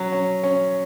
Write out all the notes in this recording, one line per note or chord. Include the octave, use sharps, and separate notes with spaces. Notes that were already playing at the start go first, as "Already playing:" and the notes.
Already playing: F#3 C#4
C#4
C#4